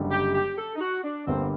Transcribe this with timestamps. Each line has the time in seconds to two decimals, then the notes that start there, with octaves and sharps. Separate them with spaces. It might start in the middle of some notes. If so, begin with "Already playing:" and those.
Already playing: F#1 F#2 D3 G3
0.11 G4
0.34 G4
0.58 A4
0.75 D#4
0.80 F#4
1.03 D4
1.26 G1 G2 D3 G3 A#3 C4